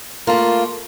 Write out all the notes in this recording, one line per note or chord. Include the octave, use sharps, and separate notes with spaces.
A3 A#3 F4